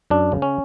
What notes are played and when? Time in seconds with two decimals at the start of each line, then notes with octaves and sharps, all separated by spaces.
0.10 F#2 D4
0.32 C#3
0.42 C#4